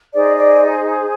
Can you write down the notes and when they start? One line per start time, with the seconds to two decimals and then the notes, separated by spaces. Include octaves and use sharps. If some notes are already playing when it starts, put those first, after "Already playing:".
0.14 D#4 G#4 C5 D5
0.37 D5